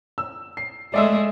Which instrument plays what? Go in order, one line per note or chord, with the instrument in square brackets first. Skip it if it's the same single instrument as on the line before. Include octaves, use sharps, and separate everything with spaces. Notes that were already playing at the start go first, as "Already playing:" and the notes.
[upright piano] E6
C7
[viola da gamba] G#3 A3 [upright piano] D5 E5 E6